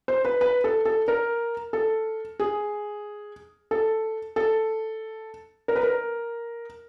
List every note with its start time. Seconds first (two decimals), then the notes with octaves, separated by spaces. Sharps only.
0.08 C5
0.25 B4
0.41 B4
0.64 A4
0.85 A4
1.08 A#4
1.73 A4
2.40 G#4
3.71 A4
4.36 A4
5.68 A#4
5.76 B4
5.83 A#4